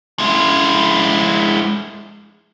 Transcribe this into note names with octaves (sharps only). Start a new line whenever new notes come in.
G#3 E4